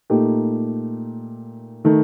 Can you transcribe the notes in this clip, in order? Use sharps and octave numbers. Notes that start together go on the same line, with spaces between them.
A#2 A3 D#4 G4
D#3 A3